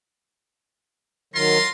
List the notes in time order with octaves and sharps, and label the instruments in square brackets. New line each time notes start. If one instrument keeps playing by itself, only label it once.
[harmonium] D#3 F#3 [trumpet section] F4 A#5 C6